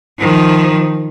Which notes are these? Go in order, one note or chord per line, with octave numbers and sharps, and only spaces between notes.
D#3 F3